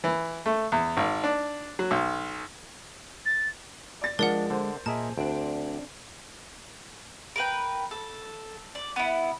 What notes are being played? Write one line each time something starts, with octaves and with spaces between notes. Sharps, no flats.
E3
A3
E2
G#1
D4
F#3
B1
A6
D5 A6
F3 G#3 D4 A#4 D5 F#5
D3 C5
A#2 G#4 A#4 D#5 E5 A5
D2 C4 D4
A#4 B4 G5
A4
D5
B3 E4